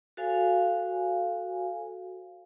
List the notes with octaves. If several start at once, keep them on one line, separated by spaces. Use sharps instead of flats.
F#4 A4 C5 F5 G#5